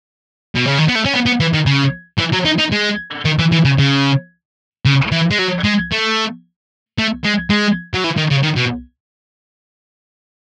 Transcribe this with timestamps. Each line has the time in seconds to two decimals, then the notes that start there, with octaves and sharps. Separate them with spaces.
0.55 B2
0.67 C#3
0.78 D#3
0.88 B3
0.95 A3
1.05 C#4
1.14 B3
1.26 B3
1.40 E3
1.54 D#3
1.66 C#3
2.19 E3
2.33 F#3
2.46 D#4
2.59 D#4
2.72 G#3
3.25 D#3
3.39 E3
3.52 E3
3.65 C#3
3.79 C#3
4.85 C#3
5.12 E3
5.31 G#3
5.38 F#3
5.64 G#3
5.92 A3
6.98 A3
7.24 G#3
7.50 G#3
7.94 F#3
8.04 E3
8.18 D#3
8.31 C#3
8.43 D#3
8.56 B2